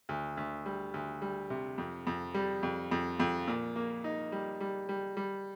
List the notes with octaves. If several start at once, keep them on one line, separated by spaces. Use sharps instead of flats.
D2
D2
G3
D2
G3
C3
F2
F2
G3
F2
F2
F2
A#2
A#3
D#4
G3
G3
G3
G3